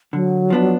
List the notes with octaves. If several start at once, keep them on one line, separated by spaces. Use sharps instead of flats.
D3 F#3
F3 B3 D4